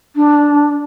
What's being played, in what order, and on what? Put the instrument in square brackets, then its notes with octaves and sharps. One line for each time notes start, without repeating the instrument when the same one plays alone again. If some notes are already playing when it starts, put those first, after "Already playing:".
[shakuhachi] D4